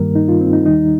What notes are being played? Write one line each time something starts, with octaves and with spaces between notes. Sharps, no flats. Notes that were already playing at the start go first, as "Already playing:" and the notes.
Already playing: G2 D#3 G3 A#3 A#4
D#4
F4
C4
D#4
D#2 D#3 G3 D#4